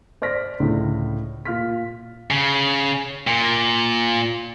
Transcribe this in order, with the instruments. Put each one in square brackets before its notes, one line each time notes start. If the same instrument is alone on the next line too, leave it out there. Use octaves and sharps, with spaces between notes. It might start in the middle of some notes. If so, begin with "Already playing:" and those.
[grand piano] C5 D5 F6 A#6 B6
C#2 A2 D3
A#2 F4 F6 B6
[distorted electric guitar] C#3
A#2